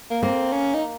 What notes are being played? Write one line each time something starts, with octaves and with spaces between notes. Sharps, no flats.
A#3
A#3 C4
C#4
D#4